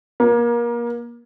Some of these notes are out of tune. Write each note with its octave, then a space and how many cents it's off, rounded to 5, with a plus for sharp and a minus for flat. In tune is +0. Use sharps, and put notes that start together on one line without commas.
A#3 +25